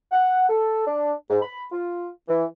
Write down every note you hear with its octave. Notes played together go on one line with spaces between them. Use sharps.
F#5
A4
D4
G#2
B5
F4
E3